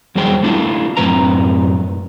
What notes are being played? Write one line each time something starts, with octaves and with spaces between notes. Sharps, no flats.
E2 F#3 G3 G#4 C5 G5
A3 D4 E4 F4
F#2 A2 E3 C4 B4 A#5